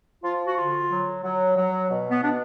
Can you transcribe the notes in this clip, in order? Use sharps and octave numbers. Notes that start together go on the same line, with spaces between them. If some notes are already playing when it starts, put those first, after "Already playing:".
F3 F4
F#4
D3 F4
F#3
F#3
F#3
B2
B3
B2 D4